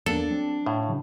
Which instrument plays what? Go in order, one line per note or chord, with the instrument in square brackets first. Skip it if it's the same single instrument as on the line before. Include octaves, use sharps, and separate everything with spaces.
[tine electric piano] E2 A#3 B3 [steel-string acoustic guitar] D4 [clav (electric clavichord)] A4
[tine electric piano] F#3 C4
[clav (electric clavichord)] A2 [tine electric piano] F5
[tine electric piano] C#3 E3 F#3